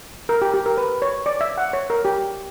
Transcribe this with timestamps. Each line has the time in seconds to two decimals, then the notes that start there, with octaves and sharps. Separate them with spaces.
0.29 A#4
0.42 G4
0.54 G4
0.66 A#4
0.78 B4
1.02 C#5
1.26 D5
1.41 E5
1.58 F#5
1.73 C#5
1.90 A#4
2.05 G4